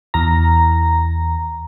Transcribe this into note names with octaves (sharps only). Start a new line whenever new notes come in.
E2 A#5